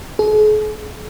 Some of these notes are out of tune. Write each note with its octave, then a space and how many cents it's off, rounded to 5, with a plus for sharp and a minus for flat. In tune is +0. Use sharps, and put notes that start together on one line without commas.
G#4 +45